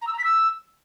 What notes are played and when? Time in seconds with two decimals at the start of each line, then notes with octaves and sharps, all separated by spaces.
0.01 A#5
0.07 E6
0.12 A#5
0.18 B6
0.24 E6